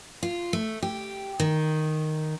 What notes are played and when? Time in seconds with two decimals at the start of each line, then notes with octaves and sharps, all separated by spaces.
0.23 F4
0.53 A3
0.83 G4
1.40 D#3